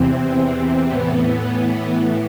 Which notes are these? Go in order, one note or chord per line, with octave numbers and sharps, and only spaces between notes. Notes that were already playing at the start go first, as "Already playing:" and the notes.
Already playing: E2 C3 E3 C4
A2 E3 B3
A2 E3